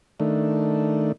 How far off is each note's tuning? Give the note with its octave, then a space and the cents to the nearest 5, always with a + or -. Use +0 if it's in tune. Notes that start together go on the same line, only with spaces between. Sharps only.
D#3 +0 A3 +0 D4 +0